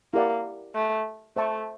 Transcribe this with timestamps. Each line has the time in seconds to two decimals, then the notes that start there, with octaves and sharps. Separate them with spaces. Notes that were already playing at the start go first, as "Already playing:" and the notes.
0.14 A#3 E4 G4 A#4 D5 F#5
0.75 A3
1.36 A3 C5 E5 A5 C#6